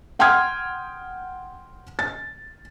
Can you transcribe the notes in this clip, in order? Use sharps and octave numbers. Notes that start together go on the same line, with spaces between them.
F#5 G5 C6 D#6 F6 G#6
A6